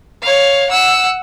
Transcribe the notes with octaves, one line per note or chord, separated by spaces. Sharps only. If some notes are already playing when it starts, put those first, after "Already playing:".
C#5 F5
F#5 E6